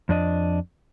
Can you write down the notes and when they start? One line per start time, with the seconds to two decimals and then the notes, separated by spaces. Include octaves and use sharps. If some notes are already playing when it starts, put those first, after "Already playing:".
0.09 F2 D4 D#5